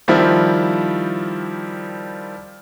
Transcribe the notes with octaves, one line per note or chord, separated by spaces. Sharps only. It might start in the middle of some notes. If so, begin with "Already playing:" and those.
D#3 F3 G3 C4 E4